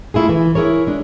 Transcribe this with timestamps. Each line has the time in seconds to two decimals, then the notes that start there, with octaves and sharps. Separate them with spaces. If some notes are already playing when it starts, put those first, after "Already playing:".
0.14 A3 E4 F4 G#4
0.29 E3
0.55 E4 G#4 A#4 C#5
0.87 G#3 D4